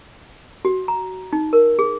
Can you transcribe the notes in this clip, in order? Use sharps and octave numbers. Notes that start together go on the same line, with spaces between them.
F#4
A#5
D#4
A#4
G#4